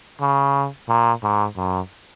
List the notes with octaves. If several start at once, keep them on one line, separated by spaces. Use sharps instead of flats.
C#3
A#2
G#2
F#2